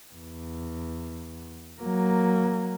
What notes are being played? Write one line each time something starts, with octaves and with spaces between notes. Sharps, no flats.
E2
F#3 A#3